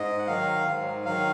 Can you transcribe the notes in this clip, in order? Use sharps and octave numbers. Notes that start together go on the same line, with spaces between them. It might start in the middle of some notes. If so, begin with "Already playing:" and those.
Already playing: G#2 D#5
F#5
D#3 F#3 F5
G#2
D#3 F#3 F5